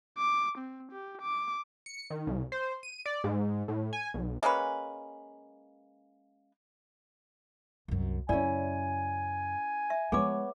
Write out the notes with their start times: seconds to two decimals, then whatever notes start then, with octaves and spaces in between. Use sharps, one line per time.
0.18 D6
0.58 C4
0.92 G4
1.21 D6
1.86 C#7
2.10 D#3
2.27 C2
2.52 C5
2.83 D#7
3.06 D5
3.24 G#2
3.68 A2
3.93 G#5
4.14 B1
4.43 G#3 A#3 C#4 B4
7.88 C2 F#2
8.29 F#2 C#3 C#4 E4 D5 G#5
9.90 E5
10.12 F3 G#3 B3 G#4 C#5 D6